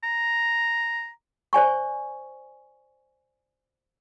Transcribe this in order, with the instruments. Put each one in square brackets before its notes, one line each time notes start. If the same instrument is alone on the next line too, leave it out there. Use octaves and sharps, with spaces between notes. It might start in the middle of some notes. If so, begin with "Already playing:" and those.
[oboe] A#5
[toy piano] C5 D5 G#5 C#6